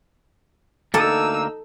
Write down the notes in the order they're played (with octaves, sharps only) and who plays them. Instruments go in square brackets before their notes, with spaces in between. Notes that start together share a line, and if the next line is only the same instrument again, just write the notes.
[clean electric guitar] D2 A#3 [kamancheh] D#4 E6 [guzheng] A4